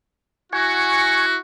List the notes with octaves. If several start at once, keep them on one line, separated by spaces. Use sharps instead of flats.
E4 F#4 G#5 C#6